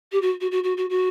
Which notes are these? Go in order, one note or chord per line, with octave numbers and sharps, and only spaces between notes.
G4
F#4
F#4
F#4
F#4
F#4
F#4